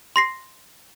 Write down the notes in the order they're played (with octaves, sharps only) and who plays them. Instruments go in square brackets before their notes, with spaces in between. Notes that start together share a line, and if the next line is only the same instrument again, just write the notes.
[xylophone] C6 A#6 C7